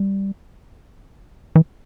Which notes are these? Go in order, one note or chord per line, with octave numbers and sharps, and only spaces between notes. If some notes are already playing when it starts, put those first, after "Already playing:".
Already playing: G3
E3